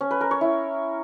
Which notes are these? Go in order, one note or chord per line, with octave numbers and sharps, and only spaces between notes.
C#4
B4
A#4
C#5
E4